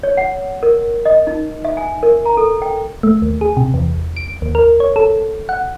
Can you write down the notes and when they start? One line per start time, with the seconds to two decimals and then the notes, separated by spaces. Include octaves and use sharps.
0.03 C#5
0.17 F#5
0.63 A#4
1.05 D#5
1.27 D#4
1.65 E5
1.77 G#5
2.03 A#4
2.25 A#5
2.37 A4
2.62 G5
3.03 A3
3.22 D#2
3.41 G#4
3.57 C3
3.74 E2
4.17 D7
4.42 D#2
4.55 A#4
4.80 C#5
4.96 A4
5.49 F#5